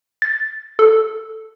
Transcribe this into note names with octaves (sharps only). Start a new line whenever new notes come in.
A6
A4